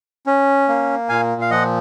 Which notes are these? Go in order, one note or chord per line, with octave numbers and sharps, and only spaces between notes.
C#4
A#3
A#2 F5 G#5
F5
F3 D#5 F#5